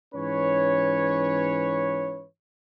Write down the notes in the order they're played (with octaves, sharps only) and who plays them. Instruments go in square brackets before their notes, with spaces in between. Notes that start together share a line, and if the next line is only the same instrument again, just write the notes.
[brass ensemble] G#2 E3 C#4 B4 C#5